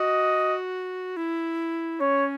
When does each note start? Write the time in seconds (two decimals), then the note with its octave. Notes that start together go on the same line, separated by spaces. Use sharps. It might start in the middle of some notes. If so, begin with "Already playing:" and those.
Already playing: F#4 D#5
1.17 E4
2.00 C#4 C#5